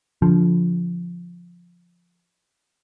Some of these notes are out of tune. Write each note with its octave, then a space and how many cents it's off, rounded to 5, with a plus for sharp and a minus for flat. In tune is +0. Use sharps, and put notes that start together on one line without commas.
D3 -30 F3 +0